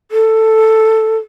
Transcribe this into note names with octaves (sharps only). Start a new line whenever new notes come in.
A4